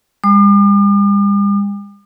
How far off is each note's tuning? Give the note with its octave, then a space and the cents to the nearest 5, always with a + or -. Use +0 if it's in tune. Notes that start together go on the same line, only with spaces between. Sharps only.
G3 +45 D6 +45